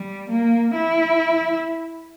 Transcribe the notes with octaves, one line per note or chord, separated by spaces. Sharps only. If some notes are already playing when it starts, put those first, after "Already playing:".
Already playing: G3
A#3
E4